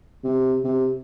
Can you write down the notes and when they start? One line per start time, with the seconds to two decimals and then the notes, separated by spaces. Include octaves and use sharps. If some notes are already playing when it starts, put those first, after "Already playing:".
0.24 C3
0.64 C3